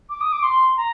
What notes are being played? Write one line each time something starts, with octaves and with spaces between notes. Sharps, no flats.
D6
D#6
D6
C6
A#5